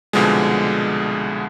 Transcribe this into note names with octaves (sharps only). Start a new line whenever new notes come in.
C2 B2 D3 F3 G#3